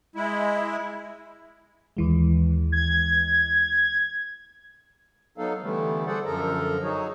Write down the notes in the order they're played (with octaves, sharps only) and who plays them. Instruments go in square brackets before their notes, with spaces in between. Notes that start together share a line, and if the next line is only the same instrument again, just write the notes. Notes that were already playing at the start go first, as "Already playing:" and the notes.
[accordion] G#3 E4
[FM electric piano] D#2 E3 G#3
[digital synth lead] G#6
[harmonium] F#3 B3 D#4 A4 F5
D3 E3 G3 A3 B3
G#4 A4 C5 D5 F#5
F#2 D3 F3 A4 A#4 A#5
F#3 D#4 F#4 G#4 C#5